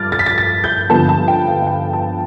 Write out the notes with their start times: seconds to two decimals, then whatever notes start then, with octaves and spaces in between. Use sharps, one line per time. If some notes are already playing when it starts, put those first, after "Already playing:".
Already playing: G2 F3 D6 F6 A6
0.12 A6
0.19 B6
0.26 A6
0.38 A6
0.64 G6
0.89 G2 D3 F3 B3 A5
1.09 A5
1.28 G5
1.48 F5
1.62 F5
1.67 G5
1.93 A5